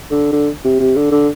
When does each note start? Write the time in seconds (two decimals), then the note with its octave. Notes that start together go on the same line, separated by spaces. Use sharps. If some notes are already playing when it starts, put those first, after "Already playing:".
0.11 D3
0.32 D3
0.64 C3
0.80 C3
0.96 D3
1.12 D3